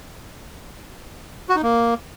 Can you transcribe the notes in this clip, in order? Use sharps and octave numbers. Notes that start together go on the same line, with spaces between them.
F#4
D#4
A#3